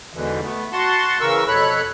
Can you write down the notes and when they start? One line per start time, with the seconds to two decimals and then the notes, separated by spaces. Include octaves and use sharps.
0.14 E2 G#2 B2 D3 E3
0.43 A3 B3
0.73 F#4 F#5 A5 C6
1.21 C#3 E3 A#4 C#6 E6
1.48 F2 B2 A4 C#5 B5 F#6